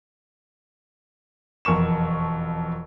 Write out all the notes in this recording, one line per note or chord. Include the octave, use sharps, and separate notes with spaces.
E1 F2 A#4 C#6 E7